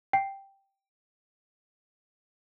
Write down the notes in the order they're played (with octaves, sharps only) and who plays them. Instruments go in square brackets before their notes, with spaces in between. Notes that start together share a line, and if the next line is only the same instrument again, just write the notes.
[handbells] G5 C7